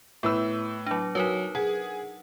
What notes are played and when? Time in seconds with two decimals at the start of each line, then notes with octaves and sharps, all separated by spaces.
0.23 A2 B3 B4 E6
0.86 F#3 D4
1.15 F#3 D#4 A#4 B4
1.55 G#4 F#5